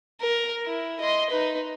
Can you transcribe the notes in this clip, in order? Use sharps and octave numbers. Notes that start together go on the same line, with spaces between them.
A#4
E4
D#5 C6
D#4 B4